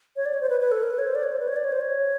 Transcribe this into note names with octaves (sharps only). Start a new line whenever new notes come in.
C#5
D5
C#5
C5
B4
B4
A4
A#4
B4
C#5
C5
D5
C#5
C5
B4
C#5
D5
C#5
C5
C#5